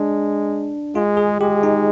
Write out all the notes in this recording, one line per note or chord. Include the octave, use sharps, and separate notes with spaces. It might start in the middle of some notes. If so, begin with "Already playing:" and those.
Already playing: G#3 D4
G#3 F4
G#4
G#3 G4
D#4